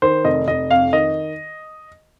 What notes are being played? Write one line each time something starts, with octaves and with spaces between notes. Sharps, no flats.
D#3 C5
F1 D#5
F1 D#5
F2 F5
D#3 D#5